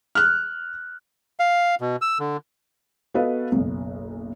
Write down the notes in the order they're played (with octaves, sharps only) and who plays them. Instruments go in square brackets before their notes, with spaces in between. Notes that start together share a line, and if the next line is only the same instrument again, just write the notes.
[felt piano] F6 F#6
[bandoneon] F5
B2
E6
D3
[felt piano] B3 F#4 A4 B4 D#5 F5
F#1 B1